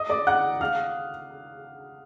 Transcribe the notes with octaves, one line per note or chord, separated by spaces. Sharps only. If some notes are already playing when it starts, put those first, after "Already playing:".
Already playing: D#5 D#6
D5 D6
F#5 F#6
F5 F6